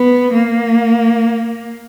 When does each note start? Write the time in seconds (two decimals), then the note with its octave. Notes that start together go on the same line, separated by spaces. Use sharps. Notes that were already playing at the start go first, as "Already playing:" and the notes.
Already playing: B3
0.33 A#3